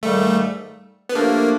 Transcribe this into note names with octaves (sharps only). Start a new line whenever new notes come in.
G#2 D#3 G3 A3 A#3
B3
F3 A3 A#3 D4 G4